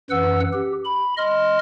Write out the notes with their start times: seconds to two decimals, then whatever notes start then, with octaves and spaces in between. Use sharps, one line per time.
0.10 F#2 E3 B4 F#5 E6
0.53 G4
0.84 B5
1.17 D#5 C6 F6